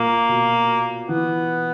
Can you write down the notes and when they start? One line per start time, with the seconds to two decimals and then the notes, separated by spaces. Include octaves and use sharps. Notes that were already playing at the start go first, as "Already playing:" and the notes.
Already playing: A#2 A#3
0.29 B2
1.09 E3 B3